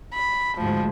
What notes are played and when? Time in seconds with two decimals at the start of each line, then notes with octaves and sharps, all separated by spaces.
0.14 B5
0.58 D2 G#2 F3 G#3